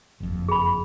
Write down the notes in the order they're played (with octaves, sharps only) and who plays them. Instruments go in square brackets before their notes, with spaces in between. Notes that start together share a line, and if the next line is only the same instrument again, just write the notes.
[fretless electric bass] F#1 F2
[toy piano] G#4 B5